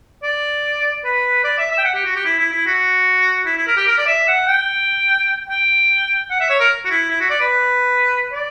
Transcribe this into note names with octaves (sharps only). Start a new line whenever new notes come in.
D5
B4
D5
E5
E5
G5
F#5
G4
F#4
G4
E4
E4
E4
F#4
E4
E4
A#4
G4
A#4
D5
E5
F#5
G5
G5
F#5
E5
C#5
A#4
F#4
E4
E4
F#4
D5
B4
D5